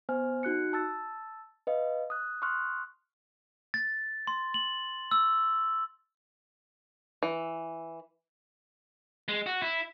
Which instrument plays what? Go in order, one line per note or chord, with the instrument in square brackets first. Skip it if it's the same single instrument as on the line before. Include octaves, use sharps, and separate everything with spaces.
[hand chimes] B3 C5 G#5 F6
D#4 F#4 F#6 C#7
A5 E6 A6
B4 D#5 F5
D#6 F#6
C6 C#6 D#6 F6 F#6
[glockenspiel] A6
C6
F#7
E6
[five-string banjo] E3
[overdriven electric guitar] G#3
F#4
E4